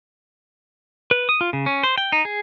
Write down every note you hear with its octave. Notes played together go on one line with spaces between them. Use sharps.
B4
D#6
F4
C#3
C#4
C5
G5
D#4
G#4